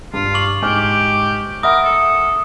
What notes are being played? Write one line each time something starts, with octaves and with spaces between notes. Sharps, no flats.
G2 F4
C#6 D6 F#7
G#2 G4 G#5 F6
A#4 E5 F#5 B5 D#6
A4